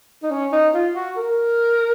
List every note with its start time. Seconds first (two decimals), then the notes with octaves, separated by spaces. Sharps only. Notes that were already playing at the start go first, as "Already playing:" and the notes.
0.23 D#4
0.31 C#4
0.52 D#4
0.74 F4
0.95 F#4
1.17 A#4